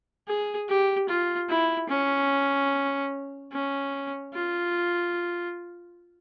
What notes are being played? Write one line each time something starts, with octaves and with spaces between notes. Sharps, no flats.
G#4
G4
F4
E4
C#4
C#4
F4